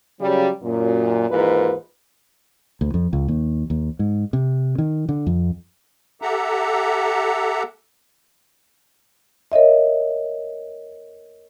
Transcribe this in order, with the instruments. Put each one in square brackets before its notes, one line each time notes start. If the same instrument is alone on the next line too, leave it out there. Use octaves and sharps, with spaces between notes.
[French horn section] C#3 F#3 G3
F#2 A#2
D#2 G#2 E3 F4 A#4 B4
[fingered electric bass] D2
F2
C#2
D#2
D#2
G#2
C3
D#3
D3
F2
[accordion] G4 A4 E5 F#5 A#5
[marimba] A#4 C#5 D#5 E5